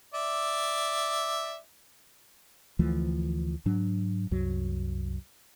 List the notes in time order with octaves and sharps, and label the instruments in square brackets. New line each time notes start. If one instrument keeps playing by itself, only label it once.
[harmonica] D5 E5
[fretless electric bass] D2 E3 F3 A3
G#2 F#3 D4
C2 F#2 F#3